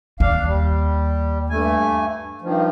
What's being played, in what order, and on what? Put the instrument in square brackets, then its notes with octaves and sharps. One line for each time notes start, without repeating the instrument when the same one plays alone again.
[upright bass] D#2 [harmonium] D4 F5
[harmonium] G3
G2 A3 G#5
G2 D#3 F3